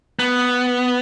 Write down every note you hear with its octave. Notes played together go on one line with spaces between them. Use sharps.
B3